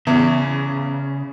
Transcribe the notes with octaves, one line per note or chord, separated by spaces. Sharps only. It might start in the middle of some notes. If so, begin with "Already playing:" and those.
E2 C#3